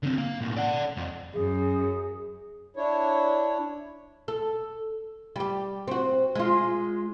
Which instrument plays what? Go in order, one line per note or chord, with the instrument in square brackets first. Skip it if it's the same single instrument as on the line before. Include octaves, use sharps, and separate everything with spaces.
[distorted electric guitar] D3 C4
A#3
B1 A2
D5 F#5
F2
[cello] F#2 [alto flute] G#4
[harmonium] D4 E4 C#5
[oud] A4
G3 G4
C4 F#4
G#3 F4